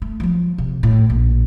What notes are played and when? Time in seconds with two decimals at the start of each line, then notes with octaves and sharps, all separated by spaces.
0.02 A3
0.20 F3 F#3
0.58 C3
0.83 A2
1.10 A#1